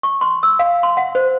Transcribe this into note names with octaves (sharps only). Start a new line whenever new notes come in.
C#6
C6
E6
F5
C6
F#5
C5